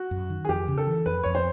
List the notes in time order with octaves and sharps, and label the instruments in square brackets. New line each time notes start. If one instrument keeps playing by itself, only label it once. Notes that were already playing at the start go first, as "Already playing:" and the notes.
Already playing: [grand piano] F#4
[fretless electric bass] F#2
D#3
[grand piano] G#4
[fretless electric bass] F2 [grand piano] G4
[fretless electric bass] C#3
[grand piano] A4
[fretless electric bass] E3
[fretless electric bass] F2 [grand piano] B4
[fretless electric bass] F2 [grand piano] C#5
[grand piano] C5